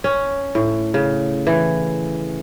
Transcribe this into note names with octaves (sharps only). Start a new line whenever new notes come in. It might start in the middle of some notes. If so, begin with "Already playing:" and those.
C#4
A2
C#3
E3